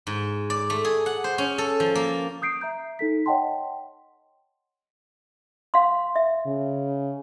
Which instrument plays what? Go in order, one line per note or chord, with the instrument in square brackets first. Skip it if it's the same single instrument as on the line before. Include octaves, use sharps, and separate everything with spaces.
[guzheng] G#2
D5
A3
G#4
F#5
C5
C#4
A4
F3
A#3
[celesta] D#6 G6 C7 D7
E5 A#5 G6
D#4 A4 B6
C#5 D#5 F#5 G5 A5 C6
[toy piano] F5 C6
E5
[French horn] C#3